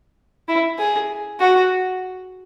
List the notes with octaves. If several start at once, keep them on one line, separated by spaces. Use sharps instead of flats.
E4
G#4
F#4